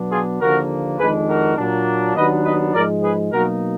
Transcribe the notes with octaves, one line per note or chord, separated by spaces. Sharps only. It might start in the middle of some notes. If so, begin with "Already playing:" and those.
Already playing: B2 F#3 B3 D4
F4 G#4
D#2 D3 F3 A#3 D4 F#4 A#4
F2 D#3 G#3 D4 G#4 B4
F#4 A#4
A#2 F#3 A#3 D4
D#2 D#3 F#3 B3 D4 B4 D#5
B4 D#5
G#2 F3 G#3 A#4 D5
G#4 B4
B2 F#3 A#3 D#4 F#4 A#4